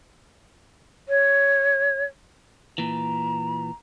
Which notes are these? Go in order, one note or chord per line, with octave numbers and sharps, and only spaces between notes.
C#5
A#2 E3 A#5